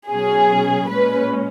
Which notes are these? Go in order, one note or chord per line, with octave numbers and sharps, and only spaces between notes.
B2 F#3 C#4 G#4
A#2 G#3 C#4 B4